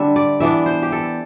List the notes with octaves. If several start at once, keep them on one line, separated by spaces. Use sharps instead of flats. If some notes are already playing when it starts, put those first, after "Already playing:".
Already playing: D3 G3 D4 E5
D5
E3 B3 D4 E5
C5
G4
A4